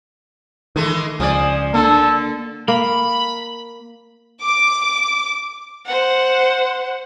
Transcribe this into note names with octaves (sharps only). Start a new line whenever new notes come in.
D#3 E3 G#3 A3
C#2 F3 G#4 D5
D3 A#3 A4
A#3 B5
D6
C5 F#5